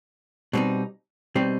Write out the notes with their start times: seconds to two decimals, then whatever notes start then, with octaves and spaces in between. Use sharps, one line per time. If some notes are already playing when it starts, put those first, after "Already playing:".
0.53 B2 G3 C4 D#4
1.35 B2 G3 C4 D#4